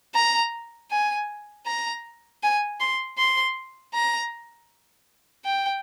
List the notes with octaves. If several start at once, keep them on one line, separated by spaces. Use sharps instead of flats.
A#5
G#5
A#5
G#5
C6
C6
A#5
G5